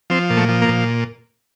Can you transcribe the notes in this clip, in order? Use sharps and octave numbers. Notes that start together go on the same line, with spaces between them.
F3 C4
A#2
A3
F3
A#3
A#2